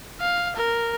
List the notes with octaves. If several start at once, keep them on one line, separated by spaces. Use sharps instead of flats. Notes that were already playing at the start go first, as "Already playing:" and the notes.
F5
A#4